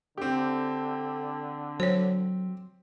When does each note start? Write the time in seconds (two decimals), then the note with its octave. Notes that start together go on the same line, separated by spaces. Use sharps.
0.18 D3 C4 G4
1.80 F#3 C5 C#5